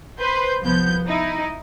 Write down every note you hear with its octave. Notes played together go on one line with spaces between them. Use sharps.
B4 C5 C6 G6
C2 F3 B3 G6
D#4 E4